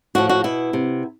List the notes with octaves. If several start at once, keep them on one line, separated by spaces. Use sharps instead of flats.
A2 F3 F#4
F#4
B2 E4
C3